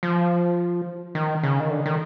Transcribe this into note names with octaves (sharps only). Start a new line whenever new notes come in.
F3
D#3
C#3
D#3
D3
D#3